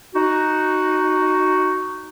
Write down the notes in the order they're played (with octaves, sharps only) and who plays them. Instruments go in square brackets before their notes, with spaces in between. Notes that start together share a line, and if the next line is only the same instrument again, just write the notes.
[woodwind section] D#4 F#4